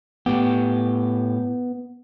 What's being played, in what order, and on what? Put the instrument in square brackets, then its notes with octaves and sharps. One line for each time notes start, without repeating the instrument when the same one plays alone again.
[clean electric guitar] A2 G4 [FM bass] B3